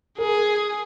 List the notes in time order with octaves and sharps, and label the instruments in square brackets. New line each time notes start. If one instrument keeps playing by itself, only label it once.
[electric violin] G#4 [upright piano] A#4